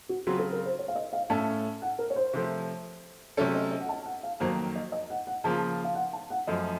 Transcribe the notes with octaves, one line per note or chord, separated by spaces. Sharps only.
F#4
C#3 F#3 C4 F4 F#4
A4
A#4
C5
C#5
F5
D#5
F5
A2 A3 C#4 A4 A5
F#5
A#4
C#5
C5
C3 F3 A3
C3 F#3 A3 C#4 A4 C#5
D#5
D#5
F#5
A5
F#5
F5
F2 D#3 F#3 A#3 C5
D#5
D#5
F#5
F#5
C#3 F3 A#3 F4 A5
F5
F#5
A5
F#5
F#2 F3 A3 D#5